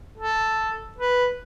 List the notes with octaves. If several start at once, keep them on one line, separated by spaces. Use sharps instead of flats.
A4
B4